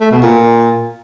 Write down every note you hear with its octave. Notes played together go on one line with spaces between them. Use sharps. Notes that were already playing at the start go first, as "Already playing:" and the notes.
A3
B2
A#2